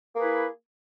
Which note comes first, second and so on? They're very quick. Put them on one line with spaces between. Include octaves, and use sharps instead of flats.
A#3 G#4 B4 E4